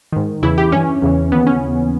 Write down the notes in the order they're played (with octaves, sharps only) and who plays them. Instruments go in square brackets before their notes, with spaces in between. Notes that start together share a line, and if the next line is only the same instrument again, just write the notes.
[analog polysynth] G#2 D#3
E2 C#3 E3 E4
G4
G2 E3 C#4
E2 C#3 E3
D#2 C#3 E3 B3
C#4